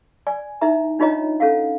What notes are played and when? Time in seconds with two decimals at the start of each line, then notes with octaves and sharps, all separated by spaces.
0.27 D5 G#5
0.61 D#4 E4 E5 A#5
0.99 D4 D#4 F4 C#5 D#5 A#5
1.40 C#4 A4 F5 F#5